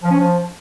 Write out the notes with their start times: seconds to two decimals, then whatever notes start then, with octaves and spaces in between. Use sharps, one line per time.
0.03 F3
0.11 C#4
0.19 F3